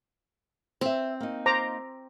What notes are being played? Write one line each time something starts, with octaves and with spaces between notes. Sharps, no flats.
C4 C5 E5
A#3 D#4
C5 A#5 D6